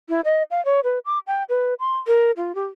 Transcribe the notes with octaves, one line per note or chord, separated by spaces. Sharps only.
E4
D#5
F5
C#5
B4
D6
G5
B4
C6
A#4
F4
G4